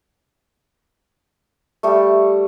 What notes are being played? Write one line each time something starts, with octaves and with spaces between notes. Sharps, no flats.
G3 A3